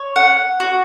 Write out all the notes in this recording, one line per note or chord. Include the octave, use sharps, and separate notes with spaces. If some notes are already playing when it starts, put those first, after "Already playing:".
Already playing: C#5
F#5
F#4